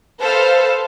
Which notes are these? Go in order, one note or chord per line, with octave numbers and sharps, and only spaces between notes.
A4 B4 C5 F5